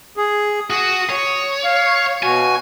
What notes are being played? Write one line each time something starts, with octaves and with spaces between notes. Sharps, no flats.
G#4
F#4 D#6
C#5
F5
B2 F#4 G#5